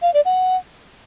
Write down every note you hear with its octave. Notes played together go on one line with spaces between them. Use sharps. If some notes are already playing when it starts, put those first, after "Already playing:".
F5
D5
F#5